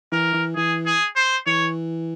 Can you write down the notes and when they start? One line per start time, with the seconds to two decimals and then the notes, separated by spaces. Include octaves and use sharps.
0.12 E3 A#4
0.34 E3
0.56 E3 G#4
0.86 G#4
1.16 C5
1.46 E3 C#5